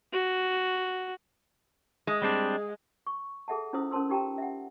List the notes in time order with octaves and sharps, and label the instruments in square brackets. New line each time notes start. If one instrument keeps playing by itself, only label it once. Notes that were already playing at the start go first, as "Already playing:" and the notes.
[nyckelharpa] F#4
[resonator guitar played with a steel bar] G#3 [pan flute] D#6
[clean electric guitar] G3 C4 D4 [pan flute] G#4
[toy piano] C#6
G#4 A4 E5 F#5 A5
C#4 E4 F4 C5 D#6 E6
C#4 A#4 C5 A5 C6 E6
D#4 F4 G4 G5 A5 A#5
E5 F#5